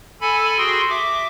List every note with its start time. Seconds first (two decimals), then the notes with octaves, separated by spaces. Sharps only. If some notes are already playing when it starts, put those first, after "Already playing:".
0.21 A4 G#5 B5
0.58 F#4 G#4 G5 C6
0.90 E5 D6